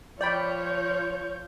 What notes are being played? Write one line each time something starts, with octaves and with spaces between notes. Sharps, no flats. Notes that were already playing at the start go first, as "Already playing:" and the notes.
F3 C#5 D5 G5 B5 G6